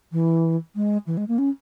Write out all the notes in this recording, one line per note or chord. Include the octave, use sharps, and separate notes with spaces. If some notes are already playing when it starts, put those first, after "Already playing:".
E3
G#3
E3
G#3
A#3
C#4